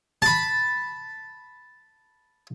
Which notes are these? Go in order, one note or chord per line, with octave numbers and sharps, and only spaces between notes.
A5 B5